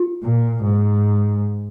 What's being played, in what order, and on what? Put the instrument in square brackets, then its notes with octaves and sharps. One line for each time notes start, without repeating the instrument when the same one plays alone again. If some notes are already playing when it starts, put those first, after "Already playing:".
Already playing: [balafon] F4
[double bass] A#2
G#2